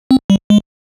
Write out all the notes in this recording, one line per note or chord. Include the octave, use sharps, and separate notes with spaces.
C4
G3
G#3